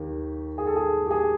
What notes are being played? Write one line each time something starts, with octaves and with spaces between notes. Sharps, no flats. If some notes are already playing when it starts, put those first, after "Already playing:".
Already playing: D#2 D#3 G4
G#4
A4
G#4
G4
G#4